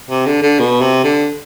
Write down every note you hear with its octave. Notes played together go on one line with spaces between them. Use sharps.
C3
D3
D3
B2
C3
D3